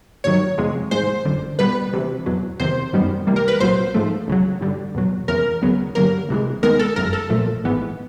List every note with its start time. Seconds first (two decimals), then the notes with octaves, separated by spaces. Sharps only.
0.24 G1 G2 D#3 F#3 C#5
0.58 E2 C3 F3 G#3
0.91 A1 G#2 D#3 G#3 C5
1.25 G1 F#2 D3
1.59 C2 B2 G3 B3 B4
1.93 D2 C3 E3
2.26 E2 B2 F#3
2.60 E2 C3 D#3 C5
2.93 F#2 D#3 G3 B3
3.27 C#2 C3 E3 G3 A#3
3.36 A#4
3.48 B4
3.60 C2 A#2 F#3 C5
3.94 G#2 F3 A3
4.28 C#2 C#3 F#3
4.61 G2 D3 G3
4.95 E2 B2 F#3
5.28 E2 C#3 E3 A#4
5.62 D2 C#3 F#3 B3
5.95 G2 D3 F#3 A#3 A#4
6.29 C2 C3 E3 G#3
6.63 D#2 D#3 G#3 B3 A#4
6.79 A4
6.96 G1 F#2 C#3 A#4
7.13 A4
7.29 B1 A#2 F3 A3
7.64 G#1 G#2 E3 G#3 B3